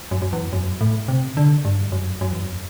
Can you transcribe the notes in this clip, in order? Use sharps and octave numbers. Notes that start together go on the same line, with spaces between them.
F#2
F#2
E2
F#2
A2
C3
D3
G2
F#2
F#2
E2
F#2